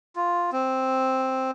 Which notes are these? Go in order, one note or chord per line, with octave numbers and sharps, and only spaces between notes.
F4
C4